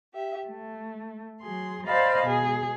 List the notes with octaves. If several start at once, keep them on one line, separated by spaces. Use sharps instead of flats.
G4 E5
A3
F#3 G#4 C6
C5 D5 D#5 F5 A5 B5
B2 G#4